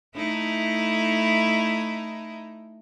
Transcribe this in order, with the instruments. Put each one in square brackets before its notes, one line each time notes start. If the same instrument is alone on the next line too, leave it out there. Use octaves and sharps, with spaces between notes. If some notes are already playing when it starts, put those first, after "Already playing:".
[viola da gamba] A3 D#4 E4